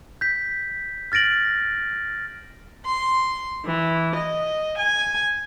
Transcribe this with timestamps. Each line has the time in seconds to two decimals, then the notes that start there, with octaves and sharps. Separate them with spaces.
0.21 G6 B6
1.12 F6 A6 A#6 D7 F#7
2.85 C6
3.65 E3
4.16 D#5
4.79 G#5